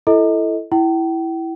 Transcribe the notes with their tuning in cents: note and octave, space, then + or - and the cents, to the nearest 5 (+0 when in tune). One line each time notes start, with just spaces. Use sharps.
E4 +20 A4 +0 D#5 +25
E4 +0 G5 -40